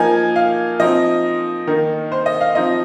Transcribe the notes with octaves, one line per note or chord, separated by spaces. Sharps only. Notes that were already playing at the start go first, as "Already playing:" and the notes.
Already playing: F3 A#3 D#4 G#5
F5
F3 C4 D#4 D#5
D#3 A#3 D#4
C5
D#5
F5
F3 C4 D#4 D#5